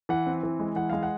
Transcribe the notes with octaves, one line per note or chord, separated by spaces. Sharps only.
E3 F#5
C4
E3
G#3
E3 F#5
G#3 F5
F#5